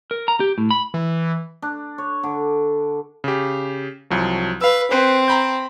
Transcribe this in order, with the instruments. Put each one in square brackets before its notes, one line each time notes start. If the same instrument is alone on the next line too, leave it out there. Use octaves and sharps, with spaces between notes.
[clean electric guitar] A#4
A#5
G4
A2
B5
[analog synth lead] E3
[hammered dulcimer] D4
C#5
D3
[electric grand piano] C#3 G4
C2 F3 F#3
[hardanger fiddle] B4 [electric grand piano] F5 E6
[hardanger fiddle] C4 [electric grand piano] B4 C5
[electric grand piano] A#5 B5 G6